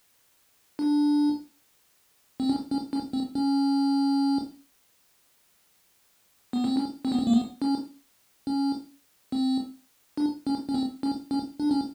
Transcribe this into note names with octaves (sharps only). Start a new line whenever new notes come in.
D4
C4
C#4
C#4
C#4
C4
C#4
B3
C4
C#4
C4
B3
C4
A#3
B3
C#4
C#4
C4
D4
C#4
C#4
C4
C#4
C#4
D4
C#4